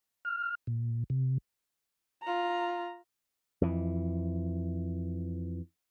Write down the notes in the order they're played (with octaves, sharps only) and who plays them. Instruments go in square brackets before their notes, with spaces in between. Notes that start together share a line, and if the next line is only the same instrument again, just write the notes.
[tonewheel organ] F6
A#2
C3
[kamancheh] F4 A#5
[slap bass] F2 E3